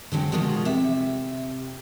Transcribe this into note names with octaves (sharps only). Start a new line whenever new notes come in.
D3 F#3 G#3 C4
B2 D#3 F3 G#3 F4 F#4
C3 E5